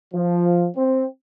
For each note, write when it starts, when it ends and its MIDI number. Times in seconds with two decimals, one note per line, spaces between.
0.14 0.67 53
0.77 1.05 60